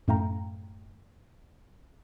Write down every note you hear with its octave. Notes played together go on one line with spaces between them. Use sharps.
F#2 A2 A3 F5 G5 A#5